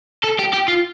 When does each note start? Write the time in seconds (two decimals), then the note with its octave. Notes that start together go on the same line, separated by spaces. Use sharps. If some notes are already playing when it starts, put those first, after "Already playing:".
0.24 A4
0.39 G4
0.53 G4
0.68 F4